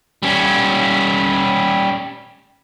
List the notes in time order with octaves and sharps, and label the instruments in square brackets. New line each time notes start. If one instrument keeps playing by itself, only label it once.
[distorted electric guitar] G3 C#4